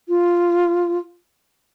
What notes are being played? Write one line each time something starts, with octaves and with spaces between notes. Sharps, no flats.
F4